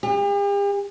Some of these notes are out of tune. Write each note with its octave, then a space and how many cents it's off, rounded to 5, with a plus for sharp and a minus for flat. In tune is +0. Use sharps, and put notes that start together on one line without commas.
G4 +45